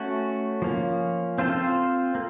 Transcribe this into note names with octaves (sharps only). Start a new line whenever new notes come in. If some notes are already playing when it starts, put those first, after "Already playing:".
Already playing: A3 C#4 F#4
F3 A#3 C#4
C4 F4 A4 C5
A#3